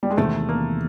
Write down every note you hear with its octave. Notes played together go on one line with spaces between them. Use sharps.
G3
G#3
E2 C3 D#3 A3
A#3